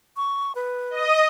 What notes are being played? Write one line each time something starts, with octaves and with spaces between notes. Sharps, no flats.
C#6
B4
D#5 D#6